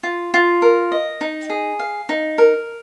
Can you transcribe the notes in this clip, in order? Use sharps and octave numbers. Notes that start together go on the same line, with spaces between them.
F4
F4
A#4
D#5
D#4
G#4
F5
D#4
A#4